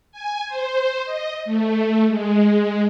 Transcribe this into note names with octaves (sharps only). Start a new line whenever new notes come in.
G#5
C5
D#5
A3
G#3